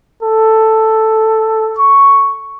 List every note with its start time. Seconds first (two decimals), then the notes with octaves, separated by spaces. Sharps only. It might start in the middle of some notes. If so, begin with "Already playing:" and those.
0.22 A4
1.78 C#6